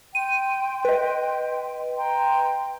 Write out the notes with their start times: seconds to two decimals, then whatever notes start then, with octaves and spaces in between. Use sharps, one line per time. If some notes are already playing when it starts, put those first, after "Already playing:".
0.15 G5 C6 D#7
0.85 B4 D#5
1.97 G5 A#5 C6